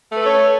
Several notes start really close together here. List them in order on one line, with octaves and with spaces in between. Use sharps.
A3 B4 A4 C#5